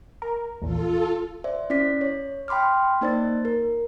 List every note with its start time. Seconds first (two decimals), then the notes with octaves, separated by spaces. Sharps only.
0.22 A#4
0.62 A#1 E2 F4 A4
1.44 C5 D5 E5
1.70 C#4 E4 D5 B6
2.01 C#5
2.48 G5 B5 C6 D6 F6
3.01 A#3 D#4 C5 D5 A6
3.45 A#4